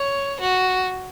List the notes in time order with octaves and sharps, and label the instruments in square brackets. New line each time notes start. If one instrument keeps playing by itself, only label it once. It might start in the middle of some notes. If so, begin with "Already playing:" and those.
Already playing: [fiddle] C#5
F#4